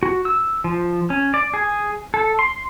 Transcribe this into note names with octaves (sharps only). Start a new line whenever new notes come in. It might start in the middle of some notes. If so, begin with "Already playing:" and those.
F#4
E6
F3
C#4
D5
G#4
A4
C6